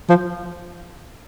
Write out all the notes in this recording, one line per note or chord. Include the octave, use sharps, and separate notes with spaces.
F3